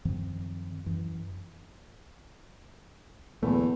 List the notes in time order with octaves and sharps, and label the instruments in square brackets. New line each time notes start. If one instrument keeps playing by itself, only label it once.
[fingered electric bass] F#2 D#3 F3 C4
F#2 E3
[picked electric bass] D1 A#2 A3 [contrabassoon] E2